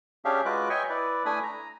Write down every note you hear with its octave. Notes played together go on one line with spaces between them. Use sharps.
C#4 D4 G4 G#4 E5 F5
G#3 F4 F#4 B4 D6 F#6
C#5 D#5 E5 G5 G#5 C#6
E4 B4 D5
A3 D4 E4 G#5 B5 D#6
A#5